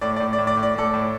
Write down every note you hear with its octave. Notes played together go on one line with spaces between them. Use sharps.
A2 D5
D5
A2
D5
A2
D5
A2
D5
A2 A4 D5
A2